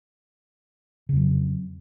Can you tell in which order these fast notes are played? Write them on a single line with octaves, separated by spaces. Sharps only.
C#3 F2 F#3